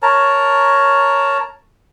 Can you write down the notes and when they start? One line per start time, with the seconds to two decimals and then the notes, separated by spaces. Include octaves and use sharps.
0.02 A#4 C#5 A5 A#5